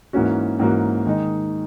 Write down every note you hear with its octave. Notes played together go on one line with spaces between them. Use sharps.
G#2 E3 A#3 C#4 F#4
G#2 E3 A#3 C#4 F#4
D#3 G#3 D#4